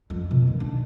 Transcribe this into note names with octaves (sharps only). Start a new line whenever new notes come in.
F2
B2
D#2
D4